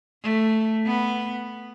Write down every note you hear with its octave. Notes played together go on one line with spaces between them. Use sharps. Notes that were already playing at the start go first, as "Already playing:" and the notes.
A3
B3